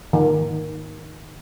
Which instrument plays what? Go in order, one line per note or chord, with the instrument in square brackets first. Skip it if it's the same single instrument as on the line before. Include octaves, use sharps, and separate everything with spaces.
[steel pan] D#3